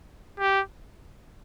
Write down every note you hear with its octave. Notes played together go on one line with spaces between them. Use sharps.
G4